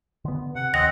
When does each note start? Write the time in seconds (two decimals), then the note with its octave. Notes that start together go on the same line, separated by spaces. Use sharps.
0.25 D3 B3
0.55 C3 F#5
0.74 D#2 C4 D#5 F#5 A#6